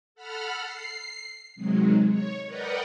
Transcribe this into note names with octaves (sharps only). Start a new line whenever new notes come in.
A4 F#5 B5 F6
C7
C3 D#3 F#3 G#3
C#5
A#4 B4 D5 D#5 F#5 G5